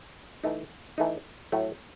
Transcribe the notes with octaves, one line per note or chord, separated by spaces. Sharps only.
E3 A3 D#4
E3 A3 D#4
A2 F#3 A3